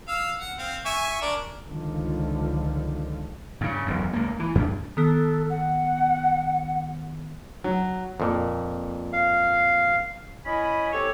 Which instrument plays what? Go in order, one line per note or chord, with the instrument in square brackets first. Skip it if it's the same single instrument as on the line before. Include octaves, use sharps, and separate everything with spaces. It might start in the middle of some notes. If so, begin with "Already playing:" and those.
[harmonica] F5 E6
F#5
C4 F5
E5 G#5 C#6
D4 A#4 D5
[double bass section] C#2 D3 D#3 F3
[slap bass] G2 C#3
E1 B1 F#2
C#2 A#3
E3
F#2 C4 D4
[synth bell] D#3 B3 F#6 [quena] A4
[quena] F#5
[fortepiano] F#3
[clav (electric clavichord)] F2 A#2
[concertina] F5
[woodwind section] C#4 E4 D#5 G#5 B5
C4 G4 A4 C#5